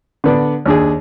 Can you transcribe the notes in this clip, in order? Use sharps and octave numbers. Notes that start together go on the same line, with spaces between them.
D3 B3 D4
D#2 D4 G#4